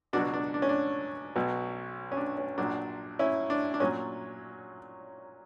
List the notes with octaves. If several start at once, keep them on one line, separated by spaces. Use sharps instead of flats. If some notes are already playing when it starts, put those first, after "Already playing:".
C#2 B2 F#3 D4 F#4
D4
D4
C#4
D4
B1 B2 F#3
C#4
D4
C#4
A#1 A#2 F#3 D4
C#4 E4
D4
D4
A#2 F#3 C#4